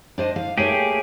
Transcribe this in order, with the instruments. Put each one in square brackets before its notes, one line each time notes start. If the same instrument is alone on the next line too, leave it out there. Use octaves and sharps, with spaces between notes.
[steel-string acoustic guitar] D4 C5 D#5
F5
[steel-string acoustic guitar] A3 A#3 C#5 [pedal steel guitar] G4 G#4